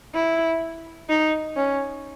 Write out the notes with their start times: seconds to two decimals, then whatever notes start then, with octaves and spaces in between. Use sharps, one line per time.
0.14 E4
1.09 D#4
1.56 C#4